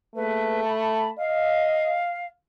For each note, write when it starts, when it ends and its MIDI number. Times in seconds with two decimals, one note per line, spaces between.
0.15 1.10 57
0.15 0.64 58
0.15 0.64 68
0.15 0.64 71
0.64 1.10 81
0.64 1.10 83
1.18 2.00 75
1.18 2.27 77